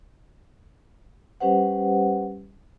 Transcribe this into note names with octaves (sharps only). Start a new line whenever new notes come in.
G3 C#4 G4 B4 C5 F#5